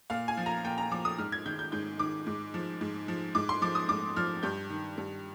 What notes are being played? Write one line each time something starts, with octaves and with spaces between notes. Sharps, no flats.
A#2 F5
G#5
F3
A#5
A#2 G5
A#5
F3 D6
D#6
G#2 F6
G#6
D#3 G6
G6
G#2 G6
D#3 D6
G#2
F3
G#2
F3
G#2 D6
C6
F3 D6
D#6
G#2 D6
F3 F6
G2 G6
D#3
G2